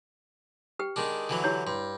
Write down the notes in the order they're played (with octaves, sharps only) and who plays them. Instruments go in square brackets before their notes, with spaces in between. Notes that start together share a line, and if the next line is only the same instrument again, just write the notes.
[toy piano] G4 B4 G5
[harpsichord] D#3 G#3 D4
D3 E3 F#3
[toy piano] E4 G4 C#5
[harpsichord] G2 [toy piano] C6